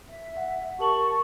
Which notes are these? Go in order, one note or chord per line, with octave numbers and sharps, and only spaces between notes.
E5
F#5
G4 A#4 A5 C#6 F#7